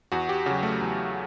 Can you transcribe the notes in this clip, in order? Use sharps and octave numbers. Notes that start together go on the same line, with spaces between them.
E2 F#4
G4
C#3 F#3 F#4
A3
E2